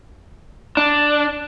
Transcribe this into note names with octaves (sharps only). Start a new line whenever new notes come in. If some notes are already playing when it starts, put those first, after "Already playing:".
D4